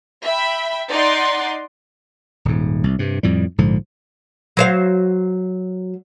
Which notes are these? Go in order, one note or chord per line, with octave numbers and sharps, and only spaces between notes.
E5 G5 B5
D#4 D5 F#5 C6
D#1 G#2
C2
G2 C3
F2 A2 G3
A#1 G#2 D3 F3
F#3 C5 F5